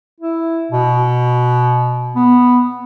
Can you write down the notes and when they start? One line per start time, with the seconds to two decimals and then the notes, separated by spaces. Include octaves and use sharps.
0.21 E4
0.72 B2
2.16 B3